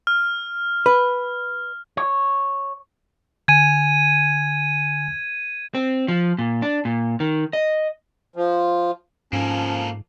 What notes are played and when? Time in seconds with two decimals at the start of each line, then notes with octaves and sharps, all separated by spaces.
0.07 F6
0.86 B4
1.97 C#5
3.48 D3 G#5 G#6 D#7
5.75 C4
6.08 F3
6.38 A#2
6.62 D4
6.85 A#2
7.20 D#3
7.53 D#5
8.36 F3
9.33 G#2 F3 A#3 C#4 A4